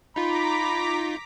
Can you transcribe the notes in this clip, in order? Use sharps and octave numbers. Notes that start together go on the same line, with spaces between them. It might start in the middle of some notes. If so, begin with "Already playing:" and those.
D#4 F4 A#5 B5 D6 B6